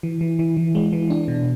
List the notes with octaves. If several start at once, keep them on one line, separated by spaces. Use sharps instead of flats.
E3
E3
E3
E3
G#3
E3
D4
B2